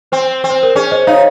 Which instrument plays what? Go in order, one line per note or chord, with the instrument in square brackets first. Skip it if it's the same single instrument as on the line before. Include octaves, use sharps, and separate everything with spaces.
[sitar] C4 [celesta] C5
[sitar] C4
[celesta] C5
A#4
[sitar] C#4 [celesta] G#4
[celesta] C5 D#5
[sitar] D#4 [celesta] C#5 F5